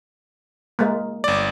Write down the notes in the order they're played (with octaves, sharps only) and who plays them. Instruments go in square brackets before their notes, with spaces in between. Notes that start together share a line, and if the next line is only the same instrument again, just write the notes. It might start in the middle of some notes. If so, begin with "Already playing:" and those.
[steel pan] G#3 A#3
[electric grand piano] G1 D5